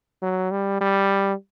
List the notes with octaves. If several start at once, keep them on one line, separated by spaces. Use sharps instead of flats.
F#3
G3
G3